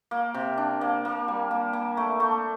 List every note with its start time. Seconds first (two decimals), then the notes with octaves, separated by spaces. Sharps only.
0.11 A#3
0.34 C3
0.57 D4
0.81 A#3
1.05 A#3
1.28 G3
1.51 A#3
1.73 A#3
1.97 A3
2.20 A3